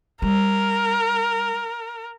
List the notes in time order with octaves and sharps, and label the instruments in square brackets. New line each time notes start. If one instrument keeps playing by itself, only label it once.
[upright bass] G3 [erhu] A#4